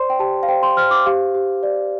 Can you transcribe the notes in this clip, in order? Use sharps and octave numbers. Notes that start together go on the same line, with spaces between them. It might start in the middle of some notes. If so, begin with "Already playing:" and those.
Already playing: C5 D5 C6
G5
G4 A5
F5
C5 G5
C6
C5 F6
D6
G4 F5
G4
D5